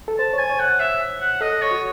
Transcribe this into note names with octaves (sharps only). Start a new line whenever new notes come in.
A4
C5 A5
C#5 G#5
C#5
F#5
E5
F#5
A4 D#5
C#5
F#4